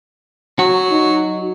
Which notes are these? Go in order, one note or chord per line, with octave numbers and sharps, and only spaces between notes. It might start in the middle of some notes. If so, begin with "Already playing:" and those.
F#3 F#4
D#4